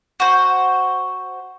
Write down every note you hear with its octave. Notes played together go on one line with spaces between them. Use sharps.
F#4 C5